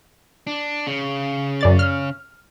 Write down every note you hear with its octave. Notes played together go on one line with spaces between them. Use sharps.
D4
C#3
F#2 D5 A6
F6